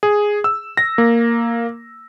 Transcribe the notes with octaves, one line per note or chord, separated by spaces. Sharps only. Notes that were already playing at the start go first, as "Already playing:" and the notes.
G#4
E6
A#6
A#3